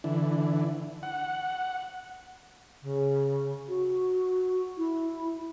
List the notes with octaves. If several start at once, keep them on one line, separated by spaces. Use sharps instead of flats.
D3 E3
F#5
C#3
F#4
E4